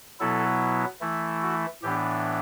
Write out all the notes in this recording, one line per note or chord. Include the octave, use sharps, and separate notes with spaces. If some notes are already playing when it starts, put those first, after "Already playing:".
B2 F#3 B3 E4 A4
E3 A3 E4
F#4
A2 E3 B3 D4 G4